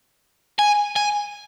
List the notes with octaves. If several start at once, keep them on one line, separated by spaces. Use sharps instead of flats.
G#5
G#5